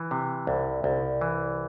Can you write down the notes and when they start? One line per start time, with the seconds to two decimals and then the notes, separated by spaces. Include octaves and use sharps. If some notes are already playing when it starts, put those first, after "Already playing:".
Already playing: E3
0.11 C3
0.47 C2
0.84 C2
1.21 E3